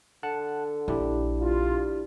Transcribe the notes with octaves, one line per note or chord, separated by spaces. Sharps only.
D3 F#5 A5 F#6
A#1 D4 E4 G4
G3 F4